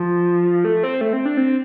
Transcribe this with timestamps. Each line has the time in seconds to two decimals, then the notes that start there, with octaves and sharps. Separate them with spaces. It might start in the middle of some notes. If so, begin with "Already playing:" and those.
Already playing: F3
0.65 A3
0.83 C4
1.01 A3
1.13 C4
1.25 D4
1.37 C4